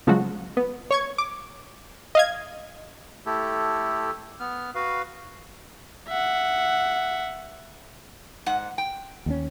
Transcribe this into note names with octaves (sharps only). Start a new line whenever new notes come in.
C#3 F3 F#3 G#3 F#4
B3
C#5 C#6 G#6
D6
D#5 F5 G#6
A3 E4 G4 A4
B3 F6
F#4 B4 F5
E5 F#5
G#2 F#5
G5
D#2 G3 C#4